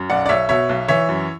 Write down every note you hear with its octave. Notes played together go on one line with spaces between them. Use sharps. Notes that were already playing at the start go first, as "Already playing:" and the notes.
Already playing: F#2
B1 D5 F#5
D5
B1 C#5 E5
B2 C#5 E5
B1
E3 C#5 E5
F#2